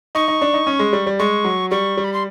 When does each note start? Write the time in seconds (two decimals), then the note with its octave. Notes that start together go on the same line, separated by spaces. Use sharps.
0.15 D#4 C#6
0.28 D#4
0.42 D4
0.54 D#4
0.67 C#4
0.79 G#3
0.93 G3
1.07 G3
1.19 G#3 C#6
1.45 F#3
1.71 G3 C#6
1.97 G3
2.04 B5
2.14 C6